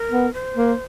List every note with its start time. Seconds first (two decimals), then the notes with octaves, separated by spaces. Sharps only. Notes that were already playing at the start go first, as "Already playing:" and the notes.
Already playing: A#4
0.11 B3
0.34 C5
0.57 A#3